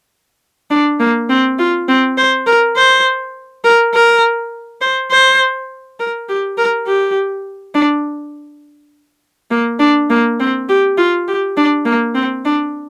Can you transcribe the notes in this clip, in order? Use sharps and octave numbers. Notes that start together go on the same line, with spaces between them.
D4
A#3
C4
F4
C4
C5
A#4
C5
A#4
A#4
C5
C5
A#4
G4
A#4
G4
D4
A#3
D4
A#3
C4
G4
F4
G4
D4
A#3
C4
D4